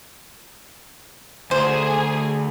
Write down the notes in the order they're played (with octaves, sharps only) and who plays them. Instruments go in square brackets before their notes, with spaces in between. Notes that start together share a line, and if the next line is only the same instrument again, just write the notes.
[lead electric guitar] D2 [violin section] G#4 [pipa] C5